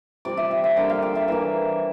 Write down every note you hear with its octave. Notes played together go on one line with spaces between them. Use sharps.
C3 G3 C4 D5
E5
E5
E5
D3 G3 A#3 G5
F5
G5
E5
E3 A#3 E5